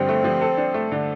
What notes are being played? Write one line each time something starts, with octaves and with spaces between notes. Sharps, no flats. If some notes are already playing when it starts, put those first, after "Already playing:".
Already playing: G2 D3 F3 C4
A3
F3
A4
D4
A3
D3